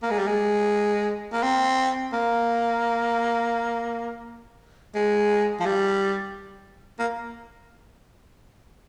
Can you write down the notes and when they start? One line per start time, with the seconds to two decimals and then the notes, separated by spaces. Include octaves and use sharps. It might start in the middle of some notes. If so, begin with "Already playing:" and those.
0.03 A#3
0.10 G#3
0.19 G3
0.27 G#3
1.33 A#3
1.43 C4
2.13 A#3
4.95 G#3
5.60 F3
5.66 G3
6.99 A#3